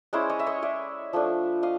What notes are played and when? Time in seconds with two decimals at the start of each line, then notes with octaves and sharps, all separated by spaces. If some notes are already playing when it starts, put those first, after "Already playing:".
0.13 G#3 C#4 E4 C5 D5
0.29 C#5 D#5
0.39 E5
0.46 C#5 D#5
0.62 D5 E5
1.13 F3 A3 D4
1.63 D#5 F5